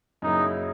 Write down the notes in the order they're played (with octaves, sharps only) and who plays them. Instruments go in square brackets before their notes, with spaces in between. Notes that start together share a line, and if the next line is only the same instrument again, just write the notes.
[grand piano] F#2 C#3 F#3 A#3 E4 [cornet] D#4